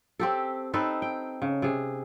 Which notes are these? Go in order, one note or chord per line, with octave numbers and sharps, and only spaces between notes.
C4 G4 A4
C4 D#4 A4 B4
G5
C#3
C3 G#4